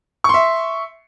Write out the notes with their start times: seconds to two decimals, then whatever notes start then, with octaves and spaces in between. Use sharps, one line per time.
0.24 C#6
0.29 C6
0.34 E5